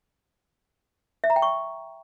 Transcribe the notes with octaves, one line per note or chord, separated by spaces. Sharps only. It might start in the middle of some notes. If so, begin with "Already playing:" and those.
E5
A#5
G5
C#6